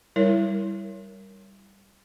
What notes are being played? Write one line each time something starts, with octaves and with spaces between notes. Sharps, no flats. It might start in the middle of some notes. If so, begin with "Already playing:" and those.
G3 E4 A#4 C#5